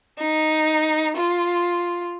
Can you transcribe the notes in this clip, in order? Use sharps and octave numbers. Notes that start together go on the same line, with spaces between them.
D#4
F4